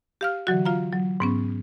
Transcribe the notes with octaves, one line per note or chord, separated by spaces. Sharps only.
G4 F5 F6
D3 E3 F#3 F#4
F4 F5 A#5
F#3
G#2 B3 C#4